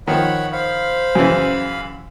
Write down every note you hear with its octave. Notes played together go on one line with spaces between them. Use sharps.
D#3 F3 C#5 F#5 B5
C5 F5 B5
F#2 C#3 E3